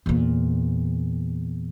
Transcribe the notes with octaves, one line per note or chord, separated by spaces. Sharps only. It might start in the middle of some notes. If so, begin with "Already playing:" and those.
E2 A#2